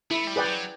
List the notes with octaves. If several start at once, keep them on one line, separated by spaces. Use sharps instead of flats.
A3 E4
G3
G#4 B4 D5 G5
F#3